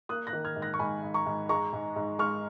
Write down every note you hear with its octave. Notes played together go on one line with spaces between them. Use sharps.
A#3 D#6 F#6
F#6 A#6
D#3
F6 G#6
G#2
F#6 A#6
C#6
G#2 G#5 B5
G#2
A#5 C#6
G#2
G#3 A#5 C#6
G#2
G#2
G#3 C#6 F6